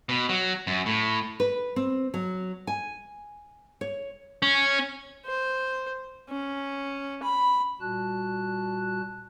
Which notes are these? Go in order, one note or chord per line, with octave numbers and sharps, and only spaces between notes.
B2
F#3
F#2
A2
B4
C4
F#3
G#5
C#5
C#4
C5
C#4
B5
A#2 G3 F#4 A5 F#6